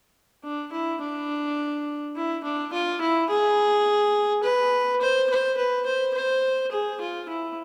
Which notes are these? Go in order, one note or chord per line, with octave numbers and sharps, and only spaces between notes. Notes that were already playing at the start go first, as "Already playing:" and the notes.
D4
E4
D4
E4
D4
F4
E4
G#4
B4
C5
C5
B4
C5
C5
G#4
F4
E4